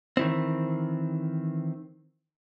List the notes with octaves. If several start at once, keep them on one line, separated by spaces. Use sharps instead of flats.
D#3 E3 C4